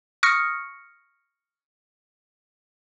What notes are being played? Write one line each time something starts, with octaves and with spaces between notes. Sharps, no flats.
C#6 D#6 F6 A#6 C#7